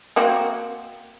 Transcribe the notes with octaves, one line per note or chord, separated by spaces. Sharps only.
A#3 C4 F#4